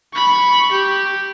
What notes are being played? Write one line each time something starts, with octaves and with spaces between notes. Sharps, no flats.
B5 C#6
G4